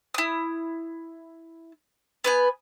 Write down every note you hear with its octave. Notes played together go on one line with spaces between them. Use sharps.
E4 D#6
B3 B4 G#5